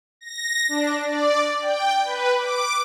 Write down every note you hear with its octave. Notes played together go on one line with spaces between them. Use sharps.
A#6
D4
D5
G5
B4
D6